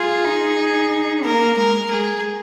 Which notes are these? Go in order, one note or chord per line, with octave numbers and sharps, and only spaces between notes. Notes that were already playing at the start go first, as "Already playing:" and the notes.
Already playing: F4 G#4
D#4
A#3 A#4
G#3 A#4
G#3 G#4